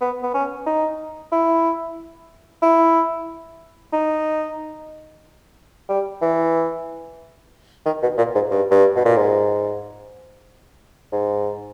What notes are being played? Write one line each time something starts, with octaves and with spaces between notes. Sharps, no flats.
B3
B3
C#4
D#4
E4
E4
D#4
G3
E3
D#3
B2
A#2
G#2
G2
G2
B2
A#2
G#2
G#2